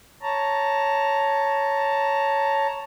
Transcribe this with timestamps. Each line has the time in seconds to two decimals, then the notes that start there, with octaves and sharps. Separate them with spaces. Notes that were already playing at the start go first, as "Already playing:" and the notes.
0.22 C#5 A5 A#5